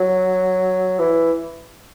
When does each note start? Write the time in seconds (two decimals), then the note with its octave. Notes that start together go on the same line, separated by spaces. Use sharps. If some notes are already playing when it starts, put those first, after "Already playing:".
Already playing: F#3
0.99 E3